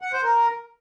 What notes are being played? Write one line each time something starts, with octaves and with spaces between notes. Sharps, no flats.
F#5
C5
A#4